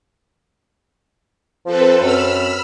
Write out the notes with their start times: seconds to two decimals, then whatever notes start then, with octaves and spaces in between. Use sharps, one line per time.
1.66 F3 C4 A4 B4
2.00 F#2 B5 E6 F6